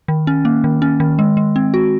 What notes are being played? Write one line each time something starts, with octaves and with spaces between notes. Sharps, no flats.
D#3
C#4
A#3
D#3
C#4
D#3
G#3
G#3
C4
F#4